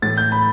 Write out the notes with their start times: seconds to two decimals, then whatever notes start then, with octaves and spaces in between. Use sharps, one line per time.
0.02 A2 E3 A6
0.17 G6
0.32 B5